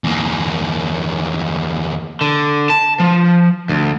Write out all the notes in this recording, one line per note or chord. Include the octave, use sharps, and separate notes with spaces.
E2 A#3
D3
A5
F3
D2